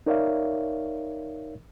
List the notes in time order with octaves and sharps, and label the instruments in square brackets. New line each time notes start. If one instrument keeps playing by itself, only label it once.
[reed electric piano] D#4 A#4 C#5 D5 E5 F5